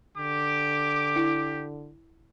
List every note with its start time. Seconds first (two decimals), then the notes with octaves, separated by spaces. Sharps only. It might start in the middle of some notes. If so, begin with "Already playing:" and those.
0.17 D3 G4 D6
1.16 E4